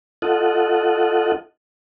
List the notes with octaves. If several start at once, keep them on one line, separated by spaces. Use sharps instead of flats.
F4 A4 D#5 F#5